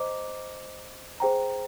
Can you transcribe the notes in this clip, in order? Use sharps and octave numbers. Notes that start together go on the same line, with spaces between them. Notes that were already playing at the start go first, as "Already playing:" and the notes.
Already playing: C5 D#5 A#5 D6
G#4 C5 G5 A#5